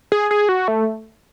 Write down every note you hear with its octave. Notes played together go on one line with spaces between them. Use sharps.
G#4
G#4
F#4
A3